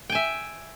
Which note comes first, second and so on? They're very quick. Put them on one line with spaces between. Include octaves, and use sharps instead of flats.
G5 G#5 E5